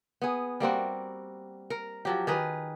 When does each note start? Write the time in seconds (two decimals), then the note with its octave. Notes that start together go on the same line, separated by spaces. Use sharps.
0.22 B3 G#4
0.60 G3 A#3 C4 F#4
1.70 A#4
2.05 F3 F#3 G4
2.27 D#3 G#4 B4